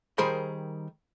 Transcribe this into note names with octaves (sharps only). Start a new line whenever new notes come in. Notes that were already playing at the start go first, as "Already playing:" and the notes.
D#3 G3 G#4 A#4 C5 B5